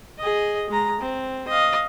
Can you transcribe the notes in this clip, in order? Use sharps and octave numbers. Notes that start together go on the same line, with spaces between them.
G#4 D#5
G#3 A#5
C4
D#5 F5